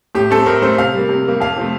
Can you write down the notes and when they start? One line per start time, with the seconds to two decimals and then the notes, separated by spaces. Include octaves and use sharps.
0.15 A2 G4
0.31 A3 C4 A4
0.46 A2 A#4
0.62 A3 C4 C5
0.78 C3 F5
0.94 G3 A#3
1.09 C3
1.25 G3 A#3
1.40 F2 F5
1.57 C3 F3 A3